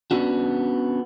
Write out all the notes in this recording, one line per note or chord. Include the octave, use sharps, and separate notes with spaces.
B3 C#4 D4 F#4